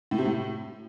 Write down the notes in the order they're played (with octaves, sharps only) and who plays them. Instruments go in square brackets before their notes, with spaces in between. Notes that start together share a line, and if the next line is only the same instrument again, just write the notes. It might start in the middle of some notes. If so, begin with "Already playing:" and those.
[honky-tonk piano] A2
C3
A2